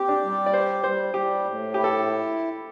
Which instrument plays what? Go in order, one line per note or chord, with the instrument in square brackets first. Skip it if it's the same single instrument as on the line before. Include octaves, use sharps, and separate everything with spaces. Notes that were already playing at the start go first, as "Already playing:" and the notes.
Already playing: [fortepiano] C4 [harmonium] G4
[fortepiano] D4
[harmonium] G3
[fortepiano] D5
[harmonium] G4 [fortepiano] C5
[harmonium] G3 [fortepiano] C5
[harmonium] G3 [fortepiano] G4
[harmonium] A2
[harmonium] E4 [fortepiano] G4
[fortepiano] A4